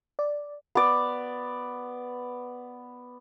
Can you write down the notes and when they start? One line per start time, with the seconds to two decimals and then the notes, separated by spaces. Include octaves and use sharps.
0.19 D5
0.75 B3 D5